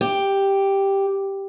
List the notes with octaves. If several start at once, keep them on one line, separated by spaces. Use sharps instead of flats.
G4